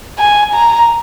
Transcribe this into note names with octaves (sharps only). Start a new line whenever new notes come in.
G#5
A#5